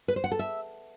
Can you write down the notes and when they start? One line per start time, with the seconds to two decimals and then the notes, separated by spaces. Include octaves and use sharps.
0.08 B4
0.16 C5
0.24 F#5
0.32 A4
0.39 E5